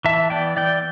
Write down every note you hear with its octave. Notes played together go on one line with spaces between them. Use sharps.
E3 E5 A5
B3 D5 G5
E3 D5 G5